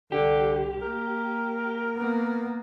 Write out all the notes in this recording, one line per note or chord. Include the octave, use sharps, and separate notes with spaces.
C2 D3 G4
A#3 A#4
A#3 B3